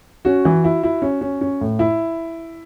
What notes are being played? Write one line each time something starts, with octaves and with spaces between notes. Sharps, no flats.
C#4 F#4
E3
E4
E4
C#4
C#4
C#4
A2
E4